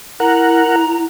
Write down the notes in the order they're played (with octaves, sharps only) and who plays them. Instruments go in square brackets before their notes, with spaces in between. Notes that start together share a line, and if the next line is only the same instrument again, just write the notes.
[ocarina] E4 [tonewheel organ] A#4 F#5 [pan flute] A#5